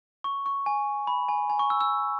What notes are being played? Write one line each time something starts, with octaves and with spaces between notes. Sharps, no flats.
C#6
C#6
G#5
B5
G#5
G#5
C#6
E6
E6